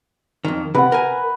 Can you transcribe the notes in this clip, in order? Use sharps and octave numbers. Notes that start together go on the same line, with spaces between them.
F2 D#3
C3 B4 F#5
A#4 G#5